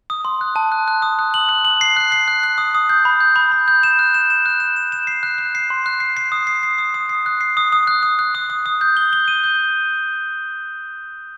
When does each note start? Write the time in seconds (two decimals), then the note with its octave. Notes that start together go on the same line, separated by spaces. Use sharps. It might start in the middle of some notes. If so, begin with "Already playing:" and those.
0.10 D#6
0.25 C6
0.41 F#6
0.56 A5
0.72 F#6
0.88 F#6
1.02 D#6
1.19 F#6
1.34 F#7
1.49 F#6
1.65 F#7
1.81 C7
1.96 F#6
2.12 C7
2.28 F#6
2.43 F#6
2.58 D#6
2.75 D#6
2.89 G6
3.05 B5
3.21 G6
3.36 B5
3.52 B5
3.68 G6
3.83 E7
3.99 F#6
4.14 E7
4.30 E7
4.46 F#6
4.60 E7
4.76 E7
4.92 E7
5.07 C7
5.23 F#6
5.38 F#6
5.55 C7
5.70 C6
5.86 F#6
6.00 C7
6.17 C7
6.32 D#6
6.47 C7
6.63 C7
6.78 D#6
6.94 D#6
7.09 C7
7.26 F#6
7.41 C7
7.57 D#6
7.72 D#6
7.87 F#6
8.03 D#6
8.19 F#6
8.35 D#6
8.50 D#6
8.66 D#6
8.81 G6
8.97 G7
9.13 G7
9.28 D#7
9.44 G6